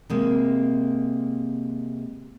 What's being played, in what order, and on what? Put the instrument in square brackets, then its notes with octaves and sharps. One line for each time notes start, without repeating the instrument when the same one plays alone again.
[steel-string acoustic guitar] C3 G#3 A#3